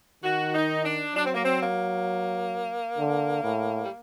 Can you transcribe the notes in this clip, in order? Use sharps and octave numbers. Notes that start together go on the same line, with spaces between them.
D#3 F#4
D#4
D4
F#3 D4
C4
A#3
C4
A#3
D3
A2
G3